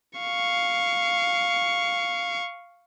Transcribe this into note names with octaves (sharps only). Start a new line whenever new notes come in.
F5 C#6